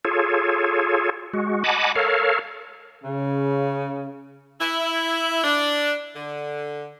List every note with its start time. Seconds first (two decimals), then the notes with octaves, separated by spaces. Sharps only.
0.05 F4 G#4 A4 C#5
1.34 G#3 F#4
1.64 D#5 F#5 G#5 A5 B5 D6
1.96 A4 A#4 C#5 F5
3.04 C#3
4.61 E4
5.44 D4
6.16 D3